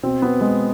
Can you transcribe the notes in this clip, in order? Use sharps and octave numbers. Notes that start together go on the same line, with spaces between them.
B2 C4
B3
G#3